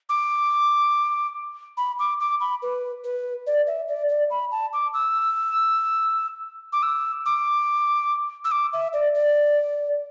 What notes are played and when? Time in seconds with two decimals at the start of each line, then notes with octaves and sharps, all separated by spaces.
0.09 D6
1.77 B5
1.99 D6
2.20 D6
2.40 B5
2.62 B4
3.04 B4
3.47 D5
3.67 E5
3.88 D5
4.09 D5
4.30 B5
4.52 A5
4.73 D6
4.94 E6
6.73 D6
6.83 E6
7.26 D6
8.45 E6
8.51 D6
8.73 E5
8.93 D5
9.15 D5